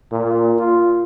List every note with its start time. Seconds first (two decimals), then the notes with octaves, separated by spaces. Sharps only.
0.12 A#2
0.58 F4